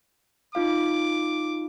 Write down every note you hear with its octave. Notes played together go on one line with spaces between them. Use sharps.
D#4 F4 F5 D6